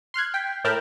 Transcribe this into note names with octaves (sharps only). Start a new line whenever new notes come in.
C6 F6 F#6 G#6
G5 B6
A2 A#4 G5 A5 B5 F6